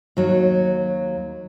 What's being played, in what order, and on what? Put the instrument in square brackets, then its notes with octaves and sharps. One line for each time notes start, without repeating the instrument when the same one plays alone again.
[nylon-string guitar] D#2 F#3